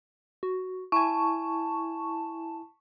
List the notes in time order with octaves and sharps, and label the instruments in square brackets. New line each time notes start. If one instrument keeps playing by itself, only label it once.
[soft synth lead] F#4
[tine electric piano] E4 G#5 [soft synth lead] A5 [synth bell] C#6